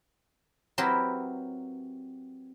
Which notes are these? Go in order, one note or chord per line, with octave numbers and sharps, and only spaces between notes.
F#3 C4 E4 G4 A#4 B4